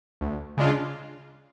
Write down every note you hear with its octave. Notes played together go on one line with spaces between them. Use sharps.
D2
C#3 G#3 D4 F4